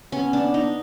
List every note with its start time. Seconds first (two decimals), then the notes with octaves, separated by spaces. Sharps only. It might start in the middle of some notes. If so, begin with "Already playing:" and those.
0.12 B3 C#4
0.33 D4
0.54 D#4